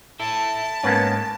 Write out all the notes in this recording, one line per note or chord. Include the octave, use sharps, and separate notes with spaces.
E4 A4 A5
G#2 A#3 B3 C#4